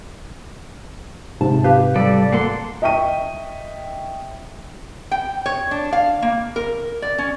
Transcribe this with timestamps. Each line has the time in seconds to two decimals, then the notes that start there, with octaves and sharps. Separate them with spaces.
1.41 G#2 C3 A5
1.64 G4 B4 F5
1.96 G3 A4 D5
2.33 A#3 A4 F#5 C6
2.82 D#5 E5 G5 C#6 D#7
5.11 G5
5.46 C#5
5.71 D4
5.93 F5
6.22 A#3
6.56 A#4
7.02 D5
7.18 C#4